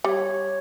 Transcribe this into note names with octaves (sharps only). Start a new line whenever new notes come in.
G3 C#5